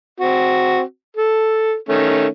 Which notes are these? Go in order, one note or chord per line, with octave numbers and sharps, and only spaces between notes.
C4 F#4
A4
D#3 A3 C#4